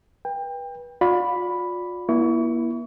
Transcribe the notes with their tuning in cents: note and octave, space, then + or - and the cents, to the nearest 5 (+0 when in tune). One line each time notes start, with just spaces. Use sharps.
B4 -25 G5 +25
F4 +40 D5 -15 B5 +0
A#3 +45 E4 +0 C#6 +35